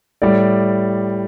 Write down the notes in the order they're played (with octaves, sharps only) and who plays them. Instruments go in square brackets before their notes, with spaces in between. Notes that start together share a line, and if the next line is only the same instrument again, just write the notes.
[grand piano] A2 G3 D5